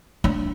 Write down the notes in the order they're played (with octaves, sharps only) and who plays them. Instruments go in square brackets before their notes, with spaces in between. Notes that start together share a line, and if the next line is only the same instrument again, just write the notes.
[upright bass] D4